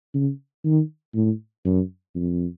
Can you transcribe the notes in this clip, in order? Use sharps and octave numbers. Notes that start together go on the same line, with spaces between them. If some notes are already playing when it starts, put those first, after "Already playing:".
C#3
D#3
A2
F#2
F2